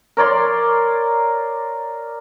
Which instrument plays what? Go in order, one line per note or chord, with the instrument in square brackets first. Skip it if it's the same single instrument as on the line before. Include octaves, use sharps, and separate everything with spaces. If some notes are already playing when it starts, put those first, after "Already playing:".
[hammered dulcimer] A#4 C#5 D5 C6